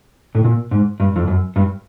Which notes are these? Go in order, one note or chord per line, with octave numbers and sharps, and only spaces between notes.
A2
A#2
G#2
G2
F2
F#2
G2